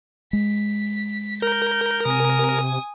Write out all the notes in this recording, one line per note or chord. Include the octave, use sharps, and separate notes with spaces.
G#3 B6
A#4 G6
C3 G#5 D#6